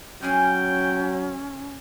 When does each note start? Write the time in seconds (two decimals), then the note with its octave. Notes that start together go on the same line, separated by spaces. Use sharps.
0.22 F#3 C#4 G#4 G5 G#5 F6